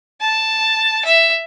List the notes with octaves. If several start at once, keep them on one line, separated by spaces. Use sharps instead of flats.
A5
E5